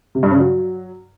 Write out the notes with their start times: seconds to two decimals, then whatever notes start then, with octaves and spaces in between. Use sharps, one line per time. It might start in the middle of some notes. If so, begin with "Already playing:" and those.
0.15 C3
0.23 G2
0.31 C#3
0.39 F#3